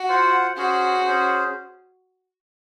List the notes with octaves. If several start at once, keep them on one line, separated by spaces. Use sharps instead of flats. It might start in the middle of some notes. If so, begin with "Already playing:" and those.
Already playing: F#4
F4 C5 F#5
C#4 F#4 G#4 C5
C#4 G#4 C5